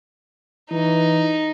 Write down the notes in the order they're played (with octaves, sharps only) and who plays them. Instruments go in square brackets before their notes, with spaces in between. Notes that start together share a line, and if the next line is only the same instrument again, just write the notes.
[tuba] E3 [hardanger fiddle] D#4